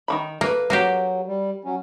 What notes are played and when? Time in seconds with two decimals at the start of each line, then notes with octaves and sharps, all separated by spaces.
0.08 D#3 E3 B5
0.41 A#3 A4 B4
0.70 F#3 A#3 F#4 G4
1.26 G3
1.65 F#3 C#4